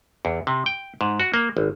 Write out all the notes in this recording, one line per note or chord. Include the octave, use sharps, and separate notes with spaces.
E2
C3
G5
G#2
F#4
A#3
G#1